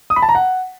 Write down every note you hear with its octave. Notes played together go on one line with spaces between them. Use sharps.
D#6
B5
A5
A#5
F#5